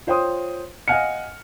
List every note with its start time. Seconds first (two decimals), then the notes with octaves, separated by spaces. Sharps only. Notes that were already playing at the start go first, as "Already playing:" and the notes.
0.07 F4 C5 C#5 G5 C6 D#6
0.88 D#5 F5 F#5 G#5 F6 C#7